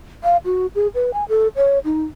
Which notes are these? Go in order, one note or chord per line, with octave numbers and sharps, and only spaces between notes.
F5
F#4
G#4
B4
G#5
A4
C#5
D#4